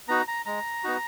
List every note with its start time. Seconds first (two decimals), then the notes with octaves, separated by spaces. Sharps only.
0.08 B3 D#4 F#4 A#5
0.28 A#5
0.46 G#3 A#5
0.84 B3 D#4 F#4